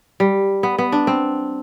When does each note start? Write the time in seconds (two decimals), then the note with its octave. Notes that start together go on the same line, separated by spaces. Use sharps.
0.20 G3
0.63 B3
0.78 B3
0.92 D4
1.07 C4